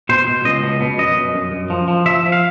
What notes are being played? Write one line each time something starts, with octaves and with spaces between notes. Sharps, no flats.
B2 C5
B2
C#2 D#5
B2
B2
F#2 D#5
F#2
F#2
F#2
F3
F3
F3 E5
F3
F5